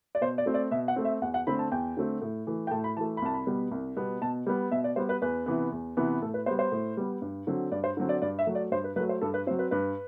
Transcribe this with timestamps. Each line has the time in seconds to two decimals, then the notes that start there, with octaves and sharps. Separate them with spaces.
0.15 D5
0.21 B2 C5
0.38 D5
0.46 A3 C4
0.54 D5
0.71 B2 E5
0.88 F#5
0.96 A3 C4
1.05 E5
1.22 E2 F#5
1.34 F#5
1.47 D3 A3 C4 B5
1.59 A5
1.72 E2 G5
1.97 D3 A3 C4
2.22 A2
2.47 E3 A3
2.67 G5
2.71 A2 A5
2.84 B5
2.97 E3 A3 A5
3.17 B5
3.22 C2 A5
3.34 B5
3.47 B2 G3 B3
3.71 C2
3.97 B2 G3 B3
4.22 B2 A5
4.46 G3 B3
4.71 B2 E5
4.84 D5
4.96 G3 B3 C5
5.09 B4
5.22 E2 B4
5.46 C3 E3 B3
5.72 E2
5.97 C3 E3 B3
6.22 A2 A4
6.34 B4
6.46 G3 B3 C5
6.59 C5
6.72 A2
6.97 G3 B3
7.22 G2
7.47 D3 F#3 C4
7.72 G2 D5
7.84 C5
7.97 D3 F#3 C4
8.09 D5
8.22 G2 D5
8.39 E5
8.47 F#3 A3
8.55 D5
8.71 G2 C5
8.84 B4
8.96 F#3 B4
9.00 A3
9.09 C5
9.21 G2 A4
9.34 B4
9.47 C4 C5
9.51 F#3
9.59 B4
9.71 G2 B4